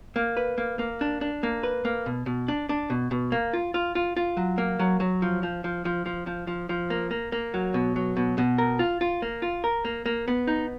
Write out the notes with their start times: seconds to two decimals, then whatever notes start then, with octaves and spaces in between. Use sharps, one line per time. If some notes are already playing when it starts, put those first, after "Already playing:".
0.16 A#3
0.37 B4
0.58 A#3
0.79 A#3
1.01 D4
1.21 D4
1.43 A#3
1.63 B4
1.85 A#3
2.06 B2
2.26 B2
2.48 D4
2.69 D4
2.90 B2
3.11 B2
3.32 A#3
3.53 F4
3.74 F4
3.95 F4
4.16 F4
4.37 F#3
4.58 A#3
4.79 F#3
5.00 F#3
5.22 F3
5.43 F3
5.64 F3
5.85 F3
6.06 F3
6.27 F3
6.47 F3
6.69 F3
6.90 A#3
7.11 A#3
7.32 A#3
7.54 F#3
7.74 B2
7.96 F#3
8.17 B2
8.38 B2
8.58 A#4
8.79 F4
9.01 F4
9.22 A#3
9.42 F4
9.64 A#4
9.85 A#3
10.06 A#3
10.28 B3
10.47 D#4